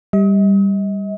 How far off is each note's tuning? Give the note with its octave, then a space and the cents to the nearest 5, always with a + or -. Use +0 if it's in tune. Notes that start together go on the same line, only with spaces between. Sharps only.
G3 +10 D#5 +40